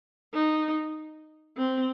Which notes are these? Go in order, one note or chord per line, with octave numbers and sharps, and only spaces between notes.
D#4
C4